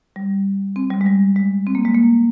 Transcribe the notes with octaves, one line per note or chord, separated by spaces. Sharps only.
G3
C4
G3
G#3
G3
G#3
C4
A#3
G#3
A#3